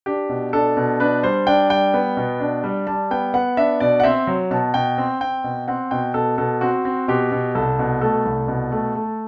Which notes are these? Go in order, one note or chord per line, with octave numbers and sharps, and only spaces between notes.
D4 G4
B2
D4 A4
B2
D4 B4
G3 C5
D4 G5
G3 G5
B3
B2
D4
G3
G3 A5
B3 G5
B3 F#5
D4 E5
B2 D5
F#5
C4 E5
F#3
B2 A5
B2 G5
C4
C4 G5
B2
C4 F#5
B2 G5
B2 A4
B2 A4
C4 F#4
C4
B2 G4
B2
C2 A4
B2
A3 A4
C2
B2
A3
A3